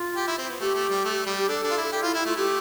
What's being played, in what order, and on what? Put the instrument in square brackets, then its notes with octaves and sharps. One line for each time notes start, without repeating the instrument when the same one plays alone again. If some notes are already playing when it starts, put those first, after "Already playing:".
Already playing: [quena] F4
[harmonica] G4
E4
C4
B3
[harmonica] A3 [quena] G4
[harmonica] A3
G3
A3
G3
[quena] G4
[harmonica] D4 [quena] A4
[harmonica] D4
F4
E4
[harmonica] G4 [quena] A4
[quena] E4 [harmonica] F4
[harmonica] E4
[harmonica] A3 [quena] F4
[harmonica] A3 [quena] G4